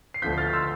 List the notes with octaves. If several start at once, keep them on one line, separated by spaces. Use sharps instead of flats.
C7
D2 D3 F3 G6 B6
F6 A6
C6 E6